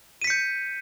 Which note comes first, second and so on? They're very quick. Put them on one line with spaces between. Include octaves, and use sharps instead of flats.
D#7 B6 C#7 G6